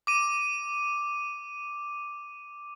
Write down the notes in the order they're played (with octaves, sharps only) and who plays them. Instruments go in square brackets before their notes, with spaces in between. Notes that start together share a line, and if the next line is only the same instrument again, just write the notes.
[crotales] D6 D#7